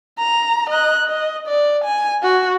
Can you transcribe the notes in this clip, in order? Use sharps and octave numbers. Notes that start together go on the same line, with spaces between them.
A#5
D#5 F#6
D#5
D5
G#5
F#4